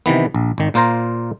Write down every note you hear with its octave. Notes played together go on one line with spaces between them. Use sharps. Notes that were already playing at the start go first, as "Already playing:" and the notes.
C3 D#3 E3 B3
A#1
G#1 D#3
A#2 A#3 F4 C5 A#5